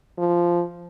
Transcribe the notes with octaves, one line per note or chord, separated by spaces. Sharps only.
F3